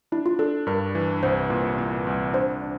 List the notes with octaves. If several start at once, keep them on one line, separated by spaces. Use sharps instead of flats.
D4 E4
F4
D4 A4
G2 A#4
E3
C2 C5
A#2
A#2
C2
D4 C5
D4